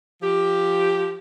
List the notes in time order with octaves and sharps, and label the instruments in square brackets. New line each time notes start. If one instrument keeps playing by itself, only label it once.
[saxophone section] F3 G4